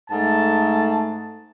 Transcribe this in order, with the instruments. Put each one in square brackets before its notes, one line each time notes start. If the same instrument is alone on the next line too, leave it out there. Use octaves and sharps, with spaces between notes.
[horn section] G#2 A3 A5